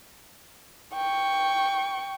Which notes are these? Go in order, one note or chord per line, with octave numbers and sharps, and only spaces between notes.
G5 C#6